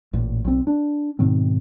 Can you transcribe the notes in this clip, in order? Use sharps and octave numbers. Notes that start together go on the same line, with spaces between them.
A1 A#2
B1 C4
D4
G#2 B2 D#3 C4